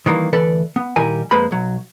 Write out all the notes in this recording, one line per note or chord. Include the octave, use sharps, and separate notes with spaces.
D#3 E3 G3 A#3
D2 E3 A4 B4 D5
B3
A#2 D#3 G3 E4 A#4 G#5
F2 G#3 A#3 B4 C5 B5
B1 F#3